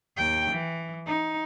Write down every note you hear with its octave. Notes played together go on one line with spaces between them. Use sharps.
D#2 G5
E3
D#4